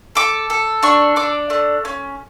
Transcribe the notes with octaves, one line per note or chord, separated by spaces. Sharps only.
A4 D6
A4
D4 C#6
D4 D6
A3
C#4